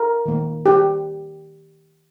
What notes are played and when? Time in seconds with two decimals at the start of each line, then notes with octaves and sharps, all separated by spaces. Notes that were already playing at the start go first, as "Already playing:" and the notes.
Already playing: A#4
0.26 D#3 A#3
0.66 G4